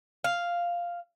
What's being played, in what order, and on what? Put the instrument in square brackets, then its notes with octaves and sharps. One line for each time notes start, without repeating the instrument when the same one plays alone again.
[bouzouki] F5